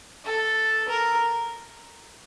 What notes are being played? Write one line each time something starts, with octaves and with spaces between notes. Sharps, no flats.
A4
A#4